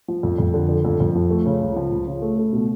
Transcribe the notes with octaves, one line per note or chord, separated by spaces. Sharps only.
F3
F2
F2
D3
D3
F2
F2
F3
A3
C#3
C#2
F3
C#2
C#3
A3
A3
B2